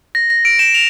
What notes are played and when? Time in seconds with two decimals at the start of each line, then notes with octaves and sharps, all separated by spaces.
0.15 A#6
0.30 A#6
0.45 D7
0.59 E7
0.75 F7